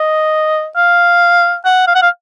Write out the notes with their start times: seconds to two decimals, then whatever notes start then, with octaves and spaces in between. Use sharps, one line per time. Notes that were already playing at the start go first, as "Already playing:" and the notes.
Already playing: D#5
0.76 F5
1.65 F#5
1.87 F5
1.95 F#5
2.02 F5